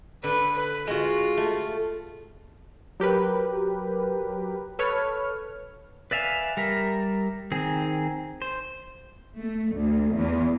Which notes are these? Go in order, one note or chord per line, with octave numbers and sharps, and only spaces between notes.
D3 B4
B4
G#3 F4 F#4
A3
F#3 G4 A#4 B4
A4 B4 C#5 F6
B4 D5 E5 F5 G#5
G3 A#4 E5
D#3 C4 G#4
C5
A3
D2
E2